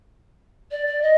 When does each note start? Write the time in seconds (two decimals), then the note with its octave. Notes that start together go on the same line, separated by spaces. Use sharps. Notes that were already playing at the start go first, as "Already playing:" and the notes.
0.71 D5
0.86 D5
1.02 D#5